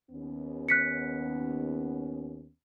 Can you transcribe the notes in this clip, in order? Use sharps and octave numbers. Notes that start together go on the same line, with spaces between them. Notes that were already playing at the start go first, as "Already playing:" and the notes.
D#2 B3 C#4
F#6 B6 C#7